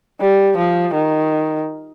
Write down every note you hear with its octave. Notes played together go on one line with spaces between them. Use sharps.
G3
F3
D#3